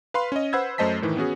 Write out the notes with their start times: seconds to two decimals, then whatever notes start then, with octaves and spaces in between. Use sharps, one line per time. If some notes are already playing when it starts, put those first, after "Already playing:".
0.14 B4 F5 B5 C6
0.32 C#4 D#5
0.53 B4 C5 F#5 B5 E6 G#6
0.78 F#2 A3 C5 D#5 A5 B6
1.02 A2 D#3 E3
1.17 B3 C#4 F#4 G#4